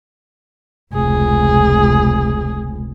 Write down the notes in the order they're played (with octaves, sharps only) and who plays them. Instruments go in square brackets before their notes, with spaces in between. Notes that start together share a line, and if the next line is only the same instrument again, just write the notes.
[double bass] F1 C#2 [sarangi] G#4